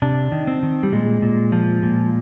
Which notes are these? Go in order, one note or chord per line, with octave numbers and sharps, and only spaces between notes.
C3 D4
D#3
C4
D#3
G3
A#2 G#3
A#2
F3
A#2